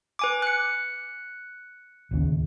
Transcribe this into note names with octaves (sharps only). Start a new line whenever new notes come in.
B4 G#5 D6
F#6 C#7
D1 D#2 C#3